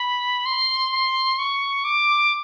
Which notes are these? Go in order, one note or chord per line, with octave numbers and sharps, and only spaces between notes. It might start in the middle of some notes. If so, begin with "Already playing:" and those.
Already playing: B5
C6
C6
C#6
D6